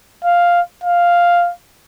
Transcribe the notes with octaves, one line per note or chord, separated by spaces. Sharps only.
F5
F5